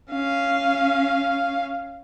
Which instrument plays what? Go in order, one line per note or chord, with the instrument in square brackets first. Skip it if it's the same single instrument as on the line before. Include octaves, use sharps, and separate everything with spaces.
[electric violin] C#4 F5